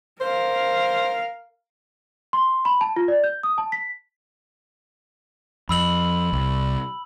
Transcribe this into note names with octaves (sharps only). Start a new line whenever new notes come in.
A#4 C5 F5
C6
B5
A5
F4
D5
G6
D#6
A5
B6
F2 B5 E6 F#7
C2